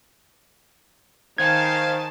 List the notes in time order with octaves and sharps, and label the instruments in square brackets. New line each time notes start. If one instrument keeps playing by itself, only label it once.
[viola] D#3 [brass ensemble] C5 F5 [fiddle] G#5 A5 [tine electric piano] G#6